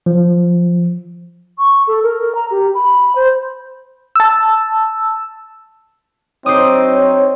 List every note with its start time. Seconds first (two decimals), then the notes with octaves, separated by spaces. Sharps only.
0.06 F3
1.58 C#6
1.87 A4
2.03 A#4
2.21 A#4
2.35 A#5
2.51 G4
2.75 B5
3.16 C5
4.16 A5 E6
6.46 F#3 C4 D4 D#4 C5 C#5 D6 D#6